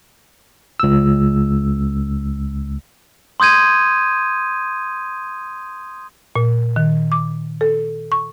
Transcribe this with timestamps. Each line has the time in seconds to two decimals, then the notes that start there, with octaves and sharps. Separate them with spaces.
0.80 C#2 E6
3.40 C6 D#6 G6 G#6 D#7
6.36 A#2
6.76 D#3
7.12 D6
7.61 A4
8.12 C#6